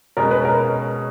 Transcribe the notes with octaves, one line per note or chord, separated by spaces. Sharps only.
B2 G#3 C#4 A#4
B4
A#4